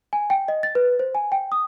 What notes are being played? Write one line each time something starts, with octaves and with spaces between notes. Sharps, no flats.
G#5
G5
D#5
A6
B4
C5
G#5
G5
D#6